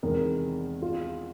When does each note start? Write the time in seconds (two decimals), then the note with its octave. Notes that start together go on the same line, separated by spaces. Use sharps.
0.03 E2 C3 D#3 G#3 A#4
0.82 F4